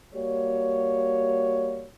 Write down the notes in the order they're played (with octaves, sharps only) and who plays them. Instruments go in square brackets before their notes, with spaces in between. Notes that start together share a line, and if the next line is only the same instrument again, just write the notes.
[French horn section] G3 A#3 F#4 C#5